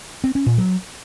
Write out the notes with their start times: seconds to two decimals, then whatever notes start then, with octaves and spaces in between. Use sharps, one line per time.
0.24 C4
0.35 C#4
0.46 A#2
0.58 F#3